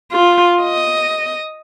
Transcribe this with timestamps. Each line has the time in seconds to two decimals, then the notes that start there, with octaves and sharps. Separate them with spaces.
0.12 F4
0.63 D#5